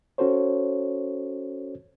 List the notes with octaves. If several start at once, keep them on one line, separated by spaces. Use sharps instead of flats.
C#4 F#4 A4 C5 C#5